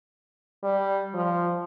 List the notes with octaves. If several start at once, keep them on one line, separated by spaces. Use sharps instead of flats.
G3
F3